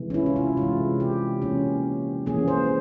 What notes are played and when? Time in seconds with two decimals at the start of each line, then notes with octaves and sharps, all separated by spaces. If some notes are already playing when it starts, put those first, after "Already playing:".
Already playing: C3 E3 G#3
0.10 C#4
0.14 E4
0.26 F4
0.36 E4
0.57 C3 E3 G#3 F4
1.00 G4
1.42 E3 A#3 C#4
2.26 E3 A#3 C#4 G#4
2.48 C5